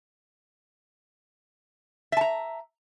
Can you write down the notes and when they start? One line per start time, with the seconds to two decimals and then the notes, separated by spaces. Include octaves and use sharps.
2.12 E5
2.17 A5
2.21 A#5